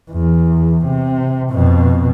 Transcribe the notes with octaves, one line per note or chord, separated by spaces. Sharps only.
E2
C3
F2 B2